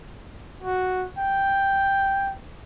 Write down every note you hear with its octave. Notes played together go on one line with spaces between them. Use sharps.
F#4
G5